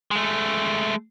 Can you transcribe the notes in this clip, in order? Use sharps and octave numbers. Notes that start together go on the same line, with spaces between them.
G#3 A3